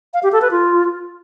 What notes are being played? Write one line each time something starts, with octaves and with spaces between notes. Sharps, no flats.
F5
G4
A4
B4
F4